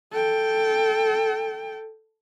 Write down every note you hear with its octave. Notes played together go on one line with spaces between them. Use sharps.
A4 G5